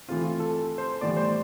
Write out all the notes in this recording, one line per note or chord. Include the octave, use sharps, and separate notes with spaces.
E3 A3 C4 F4
F4
A4
A4
C5
A2 E3 G3 B3 D5
C5